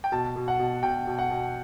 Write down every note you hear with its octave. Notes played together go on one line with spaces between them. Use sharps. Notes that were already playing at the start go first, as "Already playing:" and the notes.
G5
B2 A5
B2
F#5
B2
B2 G5
B2
F#5
B2